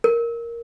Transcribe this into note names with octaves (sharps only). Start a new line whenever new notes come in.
A#4